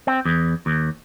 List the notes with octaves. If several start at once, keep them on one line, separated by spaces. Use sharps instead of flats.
C4
E2
D#2